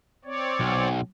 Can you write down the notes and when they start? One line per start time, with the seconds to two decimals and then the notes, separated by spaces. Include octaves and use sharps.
0.25 C4 C#5 D5
0.60 B1